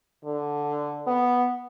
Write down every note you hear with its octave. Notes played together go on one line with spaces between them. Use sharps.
D3
B3